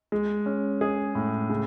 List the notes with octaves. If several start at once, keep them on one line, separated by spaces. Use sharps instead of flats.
G#3
C#4
G#4
A2
C#3